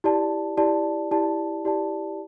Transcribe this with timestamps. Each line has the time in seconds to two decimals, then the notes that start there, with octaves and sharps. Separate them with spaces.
0.04 E4 G4 D5 A5
0.57 E4 G4 D5 A5
1.11 E4 G4 D5 A5
1.65 E4 G4 D5 A5